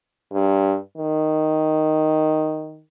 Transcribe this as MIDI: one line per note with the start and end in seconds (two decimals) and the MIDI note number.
0.33 0.76 43
0.97 2.82 51